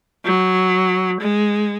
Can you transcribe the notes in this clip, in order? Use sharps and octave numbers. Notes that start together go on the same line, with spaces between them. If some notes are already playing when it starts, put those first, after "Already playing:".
F#3
G#3